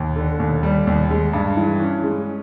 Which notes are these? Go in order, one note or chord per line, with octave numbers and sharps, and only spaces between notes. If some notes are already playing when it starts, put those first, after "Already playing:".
Already playing: D#2
D3
D#2
G3
D#2
G#3
G2
E3
C#4
G#3